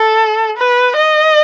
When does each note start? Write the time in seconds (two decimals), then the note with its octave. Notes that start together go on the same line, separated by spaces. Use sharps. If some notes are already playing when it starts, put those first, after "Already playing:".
Already playing: A4
0.57 B4
0.96 D#5